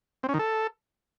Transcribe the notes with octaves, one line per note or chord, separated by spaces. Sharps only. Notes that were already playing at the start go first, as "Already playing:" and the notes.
C4
C#4
D#3
A4